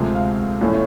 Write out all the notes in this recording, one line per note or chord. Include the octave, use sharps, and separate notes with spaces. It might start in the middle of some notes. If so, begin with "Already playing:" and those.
Already playing: D2 C3 F3 G#3
F5
A#1 A2 E3 A3 C#4